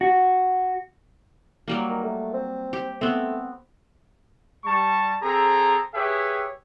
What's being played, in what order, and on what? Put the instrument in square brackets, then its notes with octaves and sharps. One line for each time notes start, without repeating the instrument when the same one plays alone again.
[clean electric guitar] F#4
[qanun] F#3 G3 A#3
[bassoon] D#3
A3
C4
[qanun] G4
[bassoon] A3 [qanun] B3 C4
[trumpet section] G3 A5 C#6
C4 G#4 A4 A#5
G4 G#4 B4 C#5 E5 G5